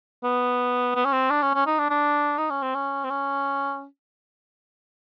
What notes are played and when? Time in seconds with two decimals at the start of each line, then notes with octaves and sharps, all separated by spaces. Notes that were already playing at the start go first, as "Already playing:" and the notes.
0.23 B3
0.95 B3
1.05 C#4
1.13 C4
1.30 D4
1.42 C#4
1.54 C#4
1.66 D#4
1.79 D4
1.90 D4
2.38 D#4
2.50 C#4
2.62 C4
2.75 C#4
3.04 C4
3.10 C#4